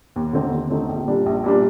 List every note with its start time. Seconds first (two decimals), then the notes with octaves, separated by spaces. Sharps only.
0.16 D#2
0.33 D3 A3 C4 D#4
0.52 D#2
0.70 D3 A3 C4 D#4
0.89 A#1
1.08 A#2 G3 D4
1.26 A#1
1.44 A#2 G3 D4